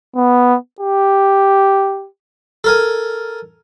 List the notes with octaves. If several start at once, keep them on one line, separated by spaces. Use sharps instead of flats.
B3
G4
A4 A#4 G#5